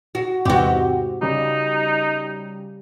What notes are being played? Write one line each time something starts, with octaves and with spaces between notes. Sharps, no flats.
F#4
E2 G#2 C3 F#4 G4
C#3 G3 D#4